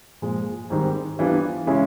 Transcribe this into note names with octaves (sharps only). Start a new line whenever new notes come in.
A#2 F3 G#3
G#2 D#3 G3 C4
E3 G3 B3 D4 F4
C#3 E3 G#3 C#4 E4